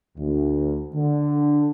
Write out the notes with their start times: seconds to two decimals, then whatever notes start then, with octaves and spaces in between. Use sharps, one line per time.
0.18 D2
0.95 D3